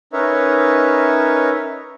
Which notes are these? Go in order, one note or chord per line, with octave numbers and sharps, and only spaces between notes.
C#4 D#4 A#4 B4 C#5 E5